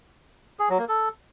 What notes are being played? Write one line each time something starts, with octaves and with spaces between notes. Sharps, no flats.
G#4
F#3
A#3
A4